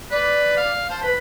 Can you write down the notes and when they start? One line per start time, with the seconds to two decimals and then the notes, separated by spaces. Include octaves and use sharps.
0.11 B4 D5
0.57 F5
0.90 C5 A5
1.03 B4 B5